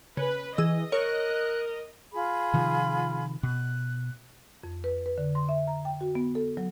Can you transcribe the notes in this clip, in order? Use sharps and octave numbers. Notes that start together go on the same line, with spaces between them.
C#3 B4
E3 G#4 D#5 E6
A#4 C#5 F#6
F4 G#4 B5
C3 D#3 F3
B2 F#6
F2
B4
B4
D3
C6
E5
A#5
G5
F#4
B3
A4
F#3